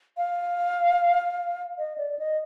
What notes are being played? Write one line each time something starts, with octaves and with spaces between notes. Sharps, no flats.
F5
D#5
D5
D#5